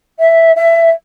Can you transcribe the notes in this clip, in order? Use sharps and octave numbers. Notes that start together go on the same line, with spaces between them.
E5
E5